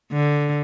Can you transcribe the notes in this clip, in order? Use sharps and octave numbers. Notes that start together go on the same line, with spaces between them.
D3